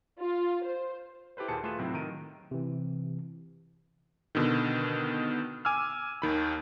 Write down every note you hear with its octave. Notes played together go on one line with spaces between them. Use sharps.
F4
C5
E4 G4 A4 B4 C5
D#2 A#2 G4 G#4 A5 C#7
A3 F4 G#4 B4 E7
A2 C3 F#3 C4 D#4
D#3 A#5 D7 D#7
C3 E3
B2 D3 D#3
G#5 D6 E6 F6
D#2 D#3 B5